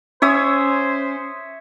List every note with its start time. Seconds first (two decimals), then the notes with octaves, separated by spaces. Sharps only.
0.22 C#4 C5 C#5 E5 D#6